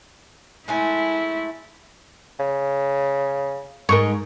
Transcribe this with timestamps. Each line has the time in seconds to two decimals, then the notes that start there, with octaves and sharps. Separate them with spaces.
0.68 G#3 A3 E4 G#5
2.39 C#3
3.89 G#2 A#4 D#5 C#6